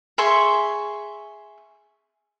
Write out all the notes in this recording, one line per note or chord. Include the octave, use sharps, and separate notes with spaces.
G#4 E5 C6 C#6